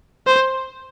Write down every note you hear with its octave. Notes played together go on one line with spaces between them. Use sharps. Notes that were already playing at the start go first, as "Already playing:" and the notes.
C5